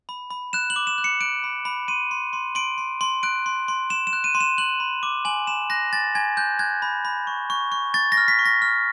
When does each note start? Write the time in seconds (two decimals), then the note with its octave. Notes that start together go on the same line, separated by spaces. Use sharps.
0.09 B5
0.30 B5
0.53 F#6 E7
0.70 F#7
0.76 D6
0.87 E7
0.98 F#6
1.04 C#7
1.21 F#6 D7
1.44 B5
1.65 B5
1.88 C6 D#7
2.11 C6
2.33 C6
2.55 C6 D7
2.78 C6
3.01 C6
3.23 F#6 D7
3.46 C6
3.68 C6
3.90 C6 E7
4.07 E7
4.13 F#6
4.24 D#7
4.35 C6
4.40 E7
4.58 F#6 F#7
4.80 B5
5.03 D6
5.25 G#5 F#7
5.47 B5 E7
5.70 F#6 A#6
5.93 G#5 A6
6.15 G#5 G#6
6.37 F#6 G6
6.59 F#6 G#6
6.82 B5
7.05 B5
7.27 C#6
7.50 C#6
7.72 C#6
7.94 C#6 A6
8.12 A#6
8.17 F6
8.28 B6
8.39 C#6
8.45 A#6
8.62 F6